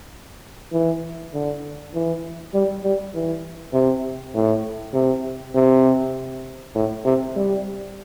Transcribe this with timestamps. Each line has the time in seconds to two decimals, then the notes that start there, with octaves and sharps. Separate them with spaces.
0.73 E3
1.34 D3
1.94 E3
2.54 G3
2.84 G3
3.14 E3
3.73 C3
4.35 A2
4.94 C3
5.55 C3
6.75 A2
7.05 C3
7.36 G3